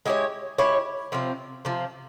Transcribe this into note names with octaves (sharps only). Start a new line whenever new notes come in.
G#3 E4 G4 C#5
G#3 E4 G4 C#5
C3 F3 C4
C3 F3 C4